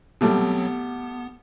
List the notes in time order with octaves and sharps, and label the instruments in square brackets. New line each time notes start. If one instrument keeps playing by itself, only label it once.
[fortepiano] B2 G3 A3 [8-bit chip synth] F#3 B3 C4
[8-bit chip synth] B3